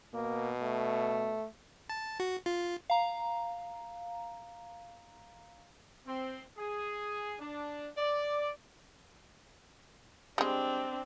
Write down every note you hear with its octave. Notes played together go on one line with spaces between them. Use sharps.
B2 A#3
A3
A5
F#4
F4
F5 A#5
C4
G#4
D4
D5
G3 G#3 C4 D4